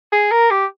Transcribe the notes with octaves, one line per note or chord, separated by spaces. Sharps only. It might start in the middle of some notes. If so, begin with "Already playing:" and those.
G#4
A#4
G4